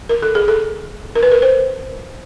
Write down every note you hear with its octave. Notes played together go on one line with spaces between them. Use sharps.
A#4
A4
G#4
A4
A#4
B4
A#4
C5